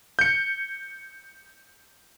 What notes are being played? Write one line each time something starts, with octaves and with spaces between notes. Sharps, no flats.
G6 C#7